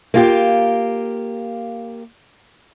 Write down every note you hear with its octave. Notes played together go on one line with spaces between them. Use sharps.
A#3 F4 G4